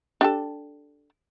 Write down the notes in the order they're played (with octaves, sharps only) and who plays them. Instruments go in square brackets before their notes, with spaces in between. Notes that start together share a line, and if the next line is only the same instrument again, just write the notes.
[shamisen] D4 G4 A4